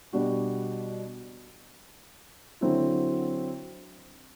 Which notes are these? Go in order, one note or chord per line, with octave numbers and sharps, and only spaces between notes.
B2 G3 D4 F#4
D3 F#3 C4 E4